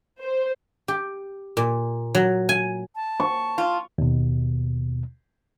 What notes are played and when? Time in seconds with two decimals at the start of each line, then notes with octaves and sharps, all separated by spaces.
0.23 C5
0.88 G4
1.57 A#2
2.15 F#3
2.49 G#5
2.95 A5
3.20 C#6
3.58 F4
3.98 D#2 B2